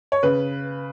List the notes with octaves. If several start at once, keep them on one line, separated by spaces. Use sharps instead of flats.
C#5
C#3 B4